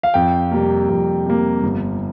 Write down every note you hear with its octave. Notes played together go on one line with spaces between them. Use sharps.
F5
F2 G5
C3 G3 A#3
F2
C3 G3 A#3
G1